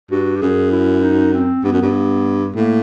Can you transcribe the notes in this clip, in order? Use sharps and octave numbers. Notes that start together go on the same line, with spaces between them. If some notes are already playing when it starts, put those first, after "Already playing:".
G2 F#4
G4
F#2 G#4
E4
D#4
C4
G2 B3
F#2
G2
A2 A#3